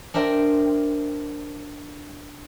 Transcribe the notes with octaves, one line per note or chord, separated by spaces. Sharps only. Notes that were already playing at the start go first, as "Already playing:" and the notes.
D4 A#4 C5 E5 G5